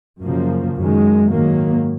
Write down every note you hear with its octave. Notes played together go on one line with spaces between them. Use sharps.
F#2 C#3 F3 A#3
F#2 D#3 G#3
G#2 D#3 F#3 A#3